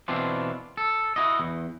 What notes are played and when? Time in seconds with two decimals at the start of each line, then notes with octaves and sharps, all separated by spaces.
0.08 B2 E3 C4 D4 F4
0.77 A4
1.16 E4 F#4 D#5
1.39 E2